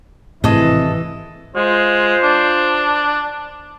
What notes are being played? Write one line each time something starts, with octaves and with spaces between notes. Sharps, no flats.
G#1 A2 C3 E3 G#4 A4 D#5
G#3 F4 C5
D4